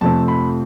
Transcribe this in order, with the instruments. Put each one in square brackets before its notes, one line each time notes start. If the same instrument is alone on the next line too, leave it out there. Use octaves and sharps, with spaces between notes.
[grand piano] F2 C3 F3 A3 C4 A5
B5